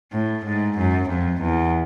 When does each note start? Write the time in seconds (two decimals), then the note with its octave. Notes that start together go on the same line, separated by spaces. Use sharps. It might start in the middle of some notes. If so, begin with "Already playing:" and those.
0.13 A2
0.45 G#2
0.77 F#2
1.09 F2
1.42 E2